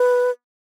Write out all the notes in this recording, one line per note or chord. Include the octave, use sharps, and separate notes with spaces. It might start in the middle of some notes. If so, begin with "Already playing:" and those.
Already playing: B4